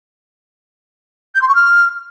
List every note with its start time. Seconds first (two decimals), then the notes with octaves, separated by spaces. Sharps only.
1.35 G6
1.41 C6
1.48 C#6
1.55 F6